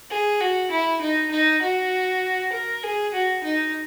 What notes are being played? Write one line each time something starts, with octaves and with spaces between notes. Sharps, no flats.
G#4
F#4
E4
D#4
D#4
F#4
A#4
G#4
F#4
D#4